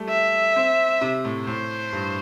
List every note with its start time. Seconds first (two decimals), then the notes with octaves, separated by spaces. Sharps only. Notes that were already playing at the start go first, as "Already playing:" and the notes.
Already playing: G3 A3
0.09 E5
0.56 C4
1.01 C3
1.25 A2
1.47 A2 C5
1.93 G2